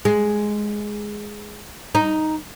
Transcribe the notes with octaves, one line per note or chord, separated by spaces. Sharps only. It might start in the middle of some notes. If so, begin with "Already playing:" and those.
G#3
D#4